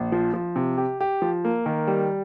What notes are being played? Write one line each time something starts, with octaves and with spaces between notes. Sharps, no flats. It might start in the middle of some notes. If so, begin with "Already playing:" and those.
Already playing: A#1
F3
F3
C3
G4
G4
F3
A#3
D#3
G3